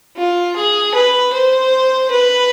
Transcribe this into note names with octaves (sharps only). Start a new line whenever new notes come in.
F4
G#4
B4
C5
B4